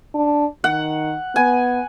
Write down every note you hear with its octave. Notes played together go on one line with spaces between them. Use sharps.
D4
D#3 F#5
B3 G#5